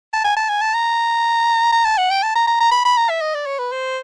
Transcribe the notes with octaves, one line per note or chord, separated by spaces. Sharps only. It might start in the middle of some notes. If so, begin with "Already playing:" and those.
A5
G#5
A5
G#5
A5
A#5
A#5
A5
F#5
G5
A5
A#5
A#5
A#5
B5
B5
A#5
E5
D#5
D5
C#5
B4
C5